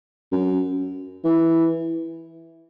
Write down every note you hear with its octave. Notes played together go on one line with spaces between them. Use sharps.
F#2
E3